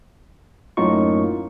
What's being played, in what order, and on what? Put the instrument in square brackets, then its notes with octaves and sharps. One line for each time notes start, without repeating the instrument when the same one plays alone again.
[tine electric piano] F#2 A2 A#3 D#4 F4 C#6